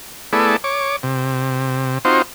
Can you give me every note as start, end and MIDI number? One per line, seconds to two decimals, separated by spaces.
0.33 0.56 57
0.33 0.56 59
0.33 0.56 64
0.33 0.56 68
0.33 0.56 69
0.33 0.56 74
0.64 0.96 73
0.64 0.96 86
1.03 1.98 48
2.05 2.22 60
2.05 2.22 63
2.05 2.22 65
2.05 2.22 66
2.05 2.22 72